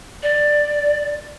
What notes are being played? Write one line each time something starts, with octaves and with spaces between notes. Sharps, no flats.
D5